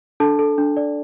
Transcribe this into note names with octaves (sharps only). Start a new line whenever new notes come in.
D4 A4 A5
A4
D4
D5